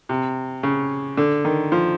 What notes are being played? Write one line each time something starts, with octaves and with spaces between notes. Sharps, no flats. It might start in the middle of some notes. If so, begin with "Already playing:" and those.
C3
C#3
D3
D#3
F3